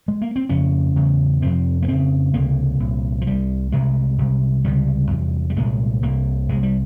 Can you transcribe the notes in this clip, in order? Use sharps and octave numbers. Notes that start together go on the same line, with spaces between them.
G#3
A#3
C4
F2 C#3 C#4
E2 C#3
F2 C3 C4
A#3
F2 C#3 C4
C#2 C3 A#3
C2 A#2
F3
C2 C3 G3
C2 C3 G#3
C2 C3
C#2 C3 G3
E2 C3
G3
C2 A#2 G#3
C2 C3 A#3
C2 C3 G#3
G3